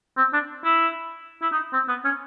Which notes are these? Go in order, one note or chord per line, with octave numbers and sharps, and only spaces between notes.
C4
D4
E4
E4
D#4
C4
B3
C#4